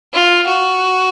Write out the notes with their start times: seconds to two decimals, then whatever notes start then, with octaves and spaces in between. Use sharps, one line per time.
0.13 F4
0.47 F#4